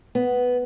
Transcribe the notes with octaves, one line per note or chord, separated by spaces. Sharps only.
B3